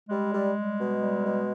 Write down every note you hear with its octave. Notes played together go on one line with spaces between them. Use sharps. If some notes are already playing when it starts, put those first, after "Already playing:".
G3 G#3
G3
G3
B2
G3
B2